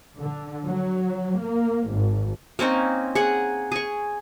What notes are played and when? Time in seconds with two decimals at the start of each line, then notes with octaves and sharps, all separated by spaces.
0.21 D3
0.67 F#3
1.41 A#3
1.90 G#1
2.59 A#3 C4 C#4 D#4
3.15 G#4 F#5
3.72 G#4 C#6